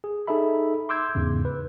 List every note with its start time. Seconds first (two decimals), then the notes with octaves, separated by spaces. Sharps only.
0.04 G#4
0.27 D#4 G#4 A4 E5 B5
0.89 C6 D6 E6 G6 G#6
1.15 E2 G#2 C#3
1.45 B4